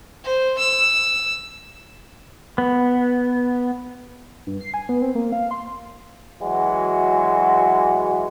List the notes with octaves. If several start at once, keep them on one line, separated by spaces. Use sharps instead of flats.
C5
E6
B3
G2
C7
G#5
B3
C4
A#3
F5
C6
E3 F#3 G#3 F#4